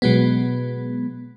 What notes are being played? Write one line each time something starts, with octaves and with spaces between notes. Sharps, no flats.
B2 F#3 G#3 B3